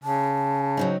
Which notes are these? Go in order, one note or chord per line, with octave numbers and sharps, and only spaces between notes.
C#3 A5
F#3 C4 D#4